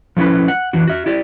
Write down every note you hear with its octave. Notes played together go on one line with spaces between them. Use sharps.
F3 A3 C#4 D#4 E4 B4
F#5
E3 D4 F#4
F#4 E5
E4 G4 D5